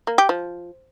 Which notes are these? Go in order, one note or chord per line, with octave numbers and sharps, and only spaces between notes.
A#3
G4
F3